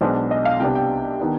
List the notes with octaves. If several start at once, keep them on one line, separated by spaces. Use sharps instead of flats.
B1 B2 G#3 B3 D4 C5
D#5
F5
C2 C3 G3 B3 D4 G5
G5
D#3 B3 D4